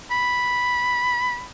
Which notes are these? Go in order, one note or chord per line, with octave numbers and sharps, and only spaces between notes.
B5